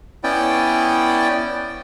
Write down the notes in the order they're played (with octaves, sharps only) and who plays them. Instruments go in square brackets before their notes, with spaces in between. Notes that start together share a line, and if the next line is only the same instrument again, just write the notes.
[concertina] B3 C#4 E4 D5 G5